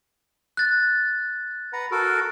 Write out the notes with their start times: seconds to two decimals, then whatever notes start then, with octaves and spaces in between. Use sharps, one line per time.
0.57 F#6 A6
1.73 B4 F#5 A#5
1.91 F#4 A4 A#4